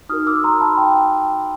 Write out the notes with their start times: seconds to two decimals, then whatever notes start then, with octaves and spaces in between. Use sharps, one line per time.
0.09 D#4 F#4 A#4 D#6 F6
0.27 D6 E6
0.44 A#5 C6
0.61 A5 B5
0.78 G5 A5